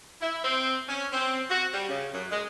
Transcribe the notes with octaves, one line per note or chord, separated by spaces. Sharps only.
E4
C4
C#4
C4
F#4
G3
C#3
F#2
G#3